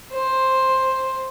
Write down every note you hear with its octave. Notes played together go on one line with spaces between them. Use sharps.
C5